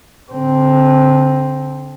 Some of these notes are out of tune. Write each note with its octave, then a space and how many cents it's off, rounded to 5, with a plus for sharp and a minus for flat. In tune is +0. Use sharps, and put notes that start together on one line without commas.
D3 -30 C4 +0